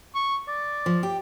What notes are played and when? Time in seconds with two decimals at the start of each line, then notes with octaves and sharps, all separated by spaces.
0.15 C#6
0.48 D5
0.86 F3
1.03 G4